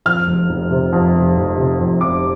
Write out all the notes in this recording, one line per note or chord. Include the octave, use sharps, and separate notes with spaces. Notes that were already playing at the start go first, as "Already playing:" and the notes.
F2 F6
F1
F1
C3
F2
F1
F1
C3
F2
F1 D6